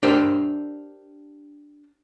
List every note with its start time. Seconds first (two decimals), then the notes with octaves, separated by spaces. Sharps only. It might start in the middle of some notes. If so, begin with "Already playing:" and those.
0.03 D4 G4 A#4 C5 E5